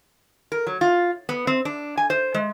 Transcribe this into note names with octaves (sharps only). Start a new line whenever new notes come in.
A#4
F#3
F4
B3
C4
D4
G#5
C5
G#3